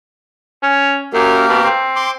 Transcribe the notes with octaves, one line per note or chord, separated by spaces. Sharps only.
C#4
F#2 A#3 G4 A#4
B2
C4
C6 D6